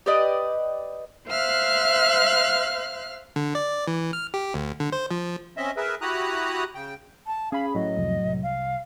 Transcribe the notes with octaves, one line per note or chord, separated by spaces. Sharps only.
G4 B4 D5 D#5
C5 E5 F5 F6 F#6
D3
D5
E3
F6
G4
D2
D3
C5
F3
C4 C#4 D#5 E5
G#4 A#4 B4 E5
E4 F#4 G4 A#5 D#6 F#6
C#3 G5
A5
C#4 G#4 F5 B5
A2 F#3 D#5
C2 F2
C2
F5